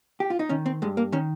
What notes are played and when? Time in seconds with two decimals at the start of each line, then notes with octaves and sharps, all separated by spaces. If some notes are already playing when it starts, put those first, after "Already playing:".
0.20 G4
0.30 F4
0.39 D#4
0.49 D#3 C#4
0.66 C4
0.82 G2 G#3
0.97 A#3
1.12 D#3 C#4